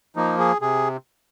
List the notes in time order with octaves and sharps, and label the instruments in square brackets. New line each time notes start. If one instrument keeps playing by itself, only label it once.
[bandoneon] F3 A#3 D#4
G#4
C3 G#4